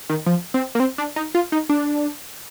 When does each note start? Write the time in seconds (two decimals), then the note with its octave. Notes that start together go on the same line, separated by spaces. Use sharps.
0.09 D#3
0.26 F3
0.54 C4
0.75 A#3
0.80 C4
0.98 D4
1.16 D#4
1.35 F4
1.52 D#4
1.69 D4